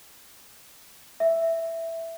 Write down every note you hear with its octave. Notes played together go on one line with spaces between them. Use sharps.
E5